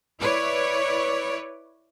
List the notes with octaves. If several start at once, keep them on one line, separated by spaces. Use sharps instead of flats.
E4 B4 C#5 D5